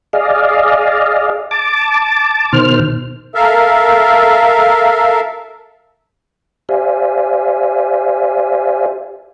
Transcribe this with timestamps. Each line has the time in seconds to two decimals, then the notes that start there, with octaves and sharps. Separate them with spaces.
0.13 G#4 D5 D#5 F5
1.51 A5 D6
2.53 B2 D#3 C5 F6
3.35 A4 A#4 E5 F5
6.69 G4 C5 D5 E5 F5 G#5